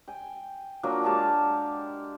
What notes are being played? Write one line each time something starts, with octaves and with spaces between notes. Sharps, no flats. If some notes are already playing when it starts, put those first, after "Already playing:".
G5 G#5
F3 F#3 A#3 D4
G#3 G4 F5 A5